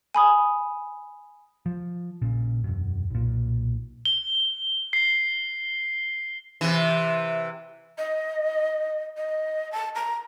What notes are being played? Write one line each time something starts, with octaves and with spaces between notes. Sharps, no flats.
G#5 B5 D#6
F3
A#1 A#2 C#3
E1 F#2
B1 A#2
G7
C7
C3 E3
D#5
D#5
A5
A#5